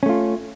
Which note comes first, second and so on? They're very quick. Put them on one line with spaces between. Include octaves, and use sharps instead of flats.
C#4 A3 F4